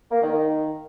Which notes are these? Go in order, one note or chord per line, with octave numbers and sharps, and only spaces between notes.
A#3
D#3
D#3